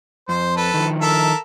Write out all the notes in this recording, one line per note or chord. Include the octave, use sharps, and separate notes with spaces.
F2 C5
A4 B4
D#3 F3
A4 A#4 E5